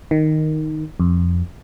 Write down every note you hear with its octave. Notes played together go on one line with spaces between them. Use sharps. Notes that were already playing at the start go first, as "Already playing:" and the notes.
D#3
F2